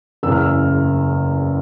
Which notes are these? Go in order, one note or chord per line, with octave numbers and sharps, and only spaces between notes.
F#1 E2 C#3 E6
F6
E6